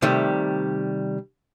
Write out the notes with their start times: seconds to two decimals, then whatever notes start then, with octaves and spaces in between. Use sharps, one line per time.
0.02 C3 D#3 G3 A3